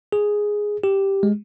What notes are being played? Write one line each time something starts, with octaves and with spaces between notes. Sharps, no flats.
G#4
G4
G#3